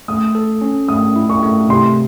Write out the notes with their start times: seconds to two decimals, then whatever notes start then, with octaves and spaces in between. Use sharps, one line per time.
0.08 A3 D#6
0.35 A4
0.61 C#4
0.88 A3 D#6
1.16 E4
1.30 C#6
1.43 A3
1.69 C3 C6